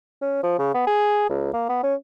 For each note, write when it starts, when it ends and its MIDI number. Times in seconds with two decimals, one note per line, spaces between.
0.22 0.38 61
0.43 0.54 53
0.59 0.71 49
0.74 0.86 59
0.87 1.29 68
1.29 1.53 37
1.54 1.65 58
1.69 1.79 59
1.83 1.94 61